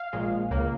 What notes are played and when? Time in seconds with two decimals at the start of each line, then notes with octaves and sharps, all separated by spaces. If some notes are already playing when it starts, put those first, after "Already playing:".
Already playing: F5
0.13 A#1 A#2 G#3
0.50 C#2 C#3 A#3